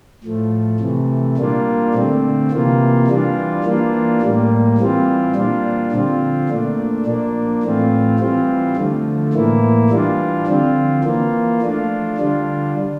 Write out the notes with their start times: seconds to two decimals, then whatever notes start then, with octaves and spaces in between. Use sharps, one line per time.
0.23 A2 F3 A3
0.80 C3 E3 A3
1.37 A#2 G3 A#3 D4 F4
1.94 D3 A3 C4
2.51 C3 E3 A#3 F4
3.08 E3 G3 D4 F4
3.64 E3 A#3 D4 F4
4.21 A2 G3 A#3
4.78 E3 G3 C4 F4
5.35 A#2 G3 D4 F4
5.92 D3 F3 C4 F4
6.49 A#2 A3 D4
7.06 F3 A#3 D4
7.63 A2 E3 A3 C4 F4
8.19 E3 G3 C4 F4
8.76 D3 F3 A3
9.33 A2 E3 A#3 E4
9.90 E3 G3 D4 F4
10.47 D3 F3 C4 F4
11.04 E3 A#3 F4
11.61 F3 A3 D4 F4
12.18 D3 G3 D4 F4